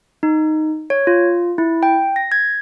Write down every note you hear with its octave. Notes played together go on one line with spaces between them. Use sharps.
D#4
C#5
F4
E4
G5
A#6
G#6